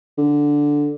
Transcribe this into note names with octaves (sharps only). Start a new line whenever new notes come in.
D3